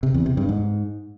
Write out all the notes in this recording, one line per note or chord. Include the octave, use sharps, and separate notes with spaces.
C3
E2
C3
G2
G#2